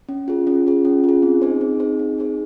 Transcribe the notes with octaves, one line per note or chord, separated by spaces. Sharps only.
C#4
F4 G#4
C#4
F4 G#4
C#4
F4 G#4
C4
D#4 G#4 C5
C4
D#4 G#4 C5
C4
D#4 G#4 C5